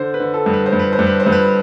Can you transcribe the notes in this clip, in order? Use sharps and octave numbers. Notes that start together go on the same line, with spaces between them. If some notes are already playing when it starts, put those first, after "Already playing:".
Already playing: D3 C5
B4
D3
A4
G2
B4
C5
G2
B4
C5
G2
B4
C5
G2
B4